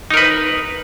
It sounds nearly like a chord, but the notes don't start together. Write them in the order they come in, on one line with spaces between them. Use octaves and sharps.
D#4 A#4 B4